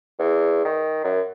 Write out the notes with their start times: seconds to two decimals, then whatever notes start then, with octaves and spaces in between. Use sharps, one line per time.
0.19 E2
0.65 D#3
1.04 F#2